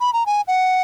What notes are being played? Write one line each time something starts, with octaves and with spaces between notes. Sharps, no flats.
B5
A#5
G#5
F#5